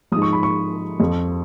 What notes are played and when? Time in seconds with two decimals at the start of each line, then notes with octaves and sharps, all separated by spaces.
0.12 G#2 F3 D#6
0.22 C#6
0.33 B5
0.43 C#6
1.00 F2 F3